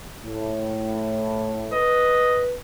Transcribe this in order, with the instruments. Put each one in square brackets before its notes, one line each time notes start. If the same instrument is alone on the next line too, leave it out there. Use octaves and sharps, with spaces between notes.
[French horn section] A2
[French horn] B4 [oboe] D#5